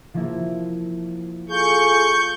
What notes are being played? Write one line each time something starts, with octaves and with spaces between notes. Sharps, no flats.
F3 A#3 E4
F4 G#4 A4 C#6 G6